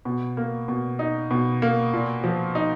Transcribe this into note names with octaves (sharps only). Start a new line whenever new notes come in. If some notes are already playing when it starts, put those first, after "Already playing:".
B2
A#3
B2
D#4
B2
A#3
A#2
F3
D#4